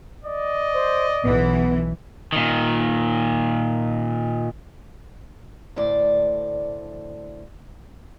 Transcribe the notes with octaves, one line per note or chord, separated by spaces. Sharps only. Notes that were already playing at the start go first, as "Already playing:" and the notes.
D5 D#5
C5
B1 E3 B3
A#2 D#3
D2 A2 C5 D5